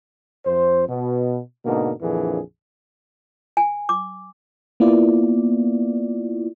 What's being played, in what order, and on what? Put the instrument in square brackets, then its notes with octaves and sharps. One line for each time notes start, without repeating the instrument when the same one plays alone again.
[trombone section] F2 C5
B2
G#2 B2 D3 A#3 D#4
A#1 F2 D3 E3 G#4
[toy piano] G#5
D6
[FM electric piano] A#3 B3 E4 F4 D5